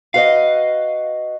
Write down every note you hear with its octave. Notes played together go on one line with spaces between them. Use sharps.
F#4 B4 D#5 F5